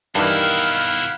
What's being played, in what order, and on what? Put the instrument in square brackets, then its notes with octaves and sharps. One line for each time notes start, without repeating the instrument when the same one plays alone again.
[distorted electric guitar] B1 E4 [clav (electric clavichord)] G2 E3 [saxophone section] D#3 [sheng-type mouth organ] F5 F#5 B5